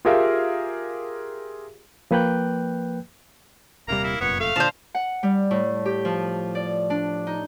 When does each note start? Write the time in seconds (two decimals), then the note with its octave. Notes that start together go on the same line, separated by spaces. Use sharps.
0.05 F4 G4 G#4 A#4 E5 F5
2.11 F3 A#3 B4 G5 F#6 G6
3.88 D#1 C3 G3 A#3 A#5
4.04 E4
4.21 F1 F#2 A#2 B3 C#5
4.40 A3 F5
4.56 A#2 D3 F3 C5 A5
4.95 F#5
5.23 G3
5.51 A2
5.85 G4
6.05 F3
6.55 D5
6.90 D4
7.27 D#4